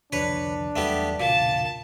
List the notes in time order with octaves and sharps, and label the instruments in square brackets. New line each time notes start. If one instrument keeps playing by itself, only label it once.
[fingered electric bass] C2 F2 D3 [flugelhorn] D4 [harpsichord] B4 C#5
[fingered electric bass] E2 F#3 G3 [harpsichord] A3 B3 G4
[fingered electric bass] B1 E2 C#3 [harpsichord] A#2 [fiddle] A5